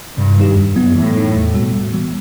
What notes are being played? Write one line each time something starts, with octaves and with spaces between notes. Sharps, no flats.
G2 C3
D#3 G3 D#4 G4
F#2
F#3 B3 E4
A2 E3
G3 D#4
E2
B2 G3 B3 F#4
A2
E3 G3 B3